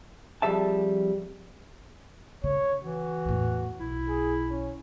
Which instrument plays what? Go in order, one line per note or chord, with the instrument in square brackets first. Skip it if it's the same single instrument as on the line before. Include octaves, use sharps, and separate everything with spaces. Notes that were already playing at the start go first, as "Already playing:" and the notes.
[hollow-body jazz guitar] F2 G3 G#4 E5 A5
[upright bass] C#3 [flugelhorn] C#5
[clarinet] E3 [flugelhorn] F#4
[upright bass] E2 A2
[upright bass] B1 [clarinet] E4
[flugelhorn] G#4
C#4